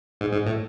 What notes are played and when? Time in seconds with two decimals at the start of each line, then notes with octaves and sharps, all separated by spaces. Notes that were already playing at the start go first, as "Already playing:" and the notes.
0.21 G#2
0.33 G#2
0.46 A2